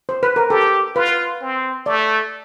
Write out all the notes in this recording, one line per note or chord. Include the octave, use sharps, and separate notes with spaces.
C5
B4
A#4
G4 A4
F4 B4
C4
A3 D5